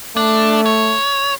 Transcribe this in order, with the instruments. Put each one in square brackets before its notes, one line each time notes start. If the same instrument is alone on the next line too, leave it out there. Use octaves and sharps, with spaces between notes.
[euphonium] A3 [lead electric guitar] D4
[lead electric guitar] C#5